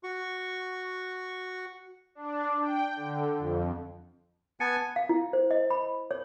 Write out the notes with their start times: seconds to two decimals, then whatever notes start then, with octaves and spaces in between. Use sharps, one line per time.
0.03 F#4 C#6
2.15 D4
2.62 G5
2.96 D3
3.38 F2
4.60 B3 G#5 A5 A6 C#7
4.96 F5
5.09 E4
5.33 C5
5.51 D#5
5.71 B5
6.11 C#5